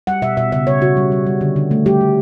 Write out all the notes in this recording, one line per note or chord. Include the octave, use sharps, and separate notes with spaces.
G3 F#5
B2 E5
B2 E5
C#3 E5
C#3 C#5
C#3 F#4
G3
G3
G3
D3
D3
A3
G3 G4
G3